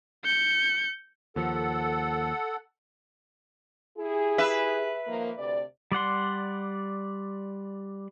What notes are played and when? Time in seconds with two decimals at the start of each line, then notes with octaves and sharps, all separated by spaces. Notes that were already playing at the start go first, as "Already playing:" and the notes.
0.25 G6 C#7
1.36 D#2 F3 A4 F#5
3.98 E4 G4 G#4
4.38 B4 E5
5.07 D#3 F3 A#3
5.38 D2 C3 D5
5.92 G3 D5 F#5 C6